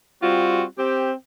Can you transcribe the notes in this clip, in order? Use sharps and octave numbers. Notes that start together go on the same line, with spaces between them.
G3 C4 F4 F#4
C4 G4